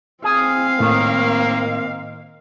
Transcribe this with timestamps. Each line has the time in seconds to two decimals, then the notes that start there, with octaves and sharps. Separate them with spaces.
0.24 C4 G#4 F5
0.80 A2 D#3 A#3